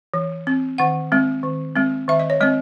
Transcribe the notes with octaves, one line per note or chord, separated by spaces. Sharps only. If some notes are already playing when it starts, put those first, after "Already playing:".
E3
C4
D#3 F#5
G#3 C4
D#3
G#3 C4
D#3 E5
D#5
C#5
G#3 C4 D#5